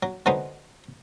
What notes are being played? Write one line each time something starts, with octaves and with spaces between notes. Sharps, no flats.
F#3
D3 F#3 G#3 B3 D#4 C5